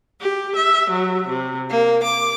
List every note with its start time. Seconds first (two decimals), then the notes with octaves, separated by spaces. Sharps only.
0.21 G4
0.57 E5
0.91 F#3
1.28 C3
1.68 A#3
2.01 D6